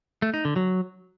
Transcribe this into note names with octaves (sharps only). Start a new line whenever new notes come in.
A3
D#4
D3
F#3